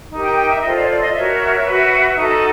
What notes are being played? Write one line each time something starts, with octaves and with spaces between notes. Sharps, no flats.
D#4 G4 A#4
G5
G5
E5
F4 A4 C5 D#5
D5
C#5
D5
D#5
F#4 A#4 C#5 E5
F#4 B4
D#4 F#4 A4